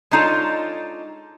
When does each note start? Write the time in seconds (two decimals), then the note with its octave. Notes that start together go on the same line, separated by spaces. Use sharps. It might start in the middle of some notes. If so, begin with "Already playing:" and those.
0.11 G#3 D4 D#4 F4 A4 C#5